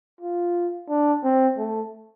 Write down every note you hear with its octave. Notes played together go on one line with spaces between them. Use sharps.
F4
D4
C4
A3